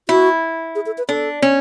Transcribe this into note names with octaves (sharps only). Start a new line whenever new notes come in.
E4 F#4
G#4
A4
B4
D4 A4
C#4